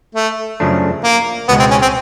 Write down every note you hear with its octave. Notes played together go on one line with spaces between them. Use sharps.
A3
F#2 C#3 F3 A3 D4
A#3
C#2 B2 G#3 B3
C4
C#4
C4